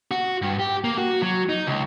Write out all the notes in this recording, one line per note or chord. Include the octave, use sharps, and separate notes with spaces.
F#4
G2
G4
A#3
F#4
F#3
D#4
C#2